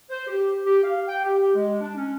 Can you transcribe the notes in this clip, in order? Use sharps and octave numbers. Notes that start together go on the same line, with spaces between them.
C5
G4
G4
F5
G5
G4
G#3
D4
C#4